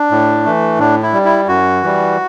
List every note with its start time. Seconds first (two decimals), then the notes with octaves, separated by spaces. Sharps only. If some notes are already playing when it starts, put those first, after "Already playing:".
Already playing: D4
0.11 A2
0.45 E3 A3
0.79 A2 D4
1.02 E4
1.13 G3
1.25 E4
1.48 F#2 F#4
1.83 E3 G3